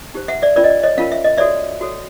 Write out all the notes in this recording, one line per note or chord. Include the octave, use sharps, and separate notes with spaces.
D#4 G4 C5
E5 F#5
D5 E5
C#4 F4 A#4 D5
D#5
D5
C#5 D#5
C#4 F4 A#4 F5
E5
D#5
F#4 A4 C#5 D5 E5
F#4 A4 C#5